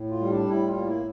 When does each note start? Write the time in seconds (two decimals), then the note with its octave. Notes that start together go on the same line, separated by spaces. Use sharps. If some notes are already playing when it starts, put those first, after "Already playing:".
Already playing: A2
0.11 F4
0.21 G3
0.30 D4
0.49 A2 E4
0.67 F4
0.77 A#3
0.86 E4